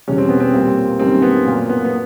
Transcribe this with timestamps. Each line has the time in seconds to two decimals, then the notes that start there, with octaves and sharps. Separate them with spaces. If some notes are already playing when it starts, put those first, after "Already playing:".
0.07 E2 B2 G3 C#4
0.18 C4
0.29 B3
0.40 C4
0.54 A#2 G3 A#3
0.99 F#2 D#3 G3 A#3 C4
1.22 B3
1.46 A#2 F#3 A#3
1.69 B3
1.85 B3